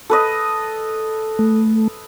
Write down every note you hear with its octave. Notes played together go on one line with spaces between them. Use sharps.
A4 B4 D#5
A3